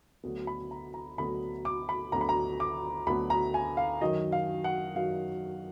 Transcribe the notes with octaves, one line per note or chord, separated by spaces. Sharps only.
D2 D3 F#3 B3
B5
A#5
A#5
D2 D3 F#3 B3 B5
D6
B5
D2 D3 F#3 B3 A#5
B5
A#5
D6
D2 D3 F#3 B3 B5
A#5
G#5
F5
F#2 D#3 F#3 D#5
F5
F#5
F#2 D#3 F#3 F5